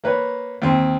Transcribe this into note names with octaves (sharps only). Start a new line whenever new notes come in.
A#3 B4 C#5
D#2 C4